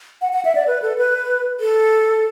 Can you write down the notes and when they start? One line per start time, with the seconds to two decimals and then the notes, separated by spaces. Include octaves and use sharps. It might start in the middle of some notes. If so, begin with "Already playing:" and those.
0.22 F#5
0.33 F#5
0.45 E5
0.55 D5
0.67 B4
0.82 A4
0.98 B4
1.60 A4